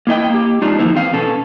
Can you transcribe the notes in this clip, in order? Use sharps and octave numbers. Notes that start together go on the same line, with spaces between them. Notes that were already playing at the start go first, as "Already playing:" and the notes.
A#3 E4 D#5 G5
A#3 G4
G#3 D4 D#4 F4
D#3 F3 A#3 D#4 E4 C5
E2 C4 F5
B2 C#4 A4